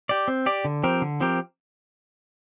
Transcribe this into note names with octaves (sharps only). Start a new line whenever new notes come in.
G4 D5
C4
G4 D5
D3
F3 C4 G4 A#4
D3
F3 C4 G4 A#4